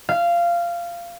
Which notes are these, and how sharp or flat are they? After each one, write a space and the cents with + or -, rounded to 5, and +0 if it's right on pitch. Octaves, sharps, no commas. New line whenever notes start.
F5 -15